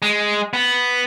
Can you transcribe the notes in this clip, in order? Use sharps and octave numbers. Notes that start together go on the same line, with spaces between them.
G#3
B3